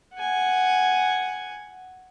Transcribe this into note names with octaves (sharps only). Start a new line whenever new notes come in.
F#5 G#5